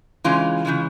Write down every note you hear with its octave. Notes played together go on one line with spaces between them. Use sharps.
C#3 E3 G#3 C#4 F4
C#3 E3 G#3 C#4